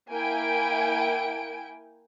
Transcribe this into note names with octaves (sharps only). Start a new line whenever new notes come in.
A#3 E4 G5 G#5 D7